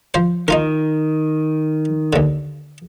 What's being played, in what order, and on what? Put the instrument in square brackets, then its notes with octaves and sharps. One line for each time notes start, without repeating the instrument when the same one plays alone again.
[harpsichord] F3 C5
[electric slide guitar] D#3 [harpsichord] D#4 F4 A#4
[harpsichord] D#2 D3